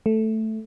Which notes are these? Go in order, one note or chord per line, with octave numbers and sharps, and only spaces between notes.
A3